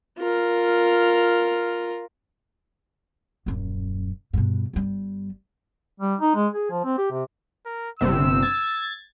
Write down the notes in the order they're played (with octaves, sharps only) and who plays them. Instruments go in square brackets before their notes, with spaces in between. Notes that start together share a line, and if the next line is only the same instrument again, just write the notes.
[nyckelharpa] F4 A#4
[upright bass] D#1 F#2
G2 B2
G1 G3
[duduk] G3
D#4
G#3
G#4
F3
C4
G4
C3
[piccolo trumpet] A#4
[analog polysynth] G1 C3 E7 [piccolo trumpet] E6
[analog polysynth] G#6 A6